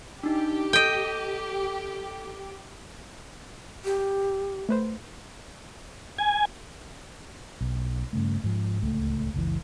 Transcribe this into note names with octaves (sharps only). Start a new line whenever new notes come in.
D4 D#4 G4
A4 D#5 G5
G4
A3 B4 C5
G#5
B1
G2 C#3 A3
G#2 F3
D1 C#2 A3
F#1 C#2 B2 E3